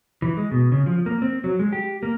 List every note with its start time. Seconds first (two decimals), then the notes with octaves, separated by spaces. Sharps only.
0.22 E3
0.37 G#3
0.52 B2
0.72 C#3
0.86 F3
1.06 A#3
1.22 C4
1.44 F#3
1.59 G#3
1.73 G4
2.03 A#3